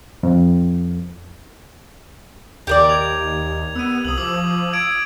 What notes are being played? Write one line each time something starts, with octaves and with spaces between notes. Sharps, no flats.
F2
D#2 G4 A#4 D5
G#6 F7
B3 E6 D#7
C2 D#6 F#7
F3 D6 E6 F#7
E6 G#6 D7